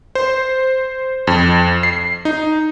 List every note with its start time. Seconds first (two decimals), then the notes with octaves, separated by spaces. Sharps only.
0.15 C5
1.27 F2
1.83 C7
2.25 D#4